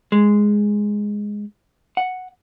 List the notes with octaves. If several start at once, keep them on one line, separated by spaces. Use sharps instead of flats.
G#3
F#5